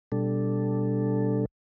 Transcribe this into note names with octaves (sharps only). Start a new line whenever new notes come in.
B2 G3 D4 A4